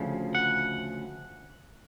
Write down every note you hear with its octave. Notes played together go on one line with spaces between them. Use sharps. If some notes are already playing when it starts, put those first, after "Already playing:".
Already playing: D2 C#3 F3
F#5